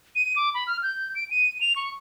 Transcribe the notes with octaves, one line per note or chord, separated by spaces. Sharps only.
D#7
D6
B5
F6
G6
D7
D#7
F7
C#6